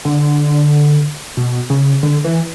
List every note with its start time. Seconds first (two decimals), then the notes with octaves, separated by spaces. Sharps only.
0.05 D3
1.37 B2
1.70 C#3
2.03 D3
2.24 E3